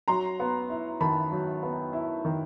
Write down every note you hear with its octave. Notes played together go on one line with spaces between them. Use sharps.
F#3 A#5 C6
B3
E4
D#3 A5 B5
F#3
B3
E4
D#3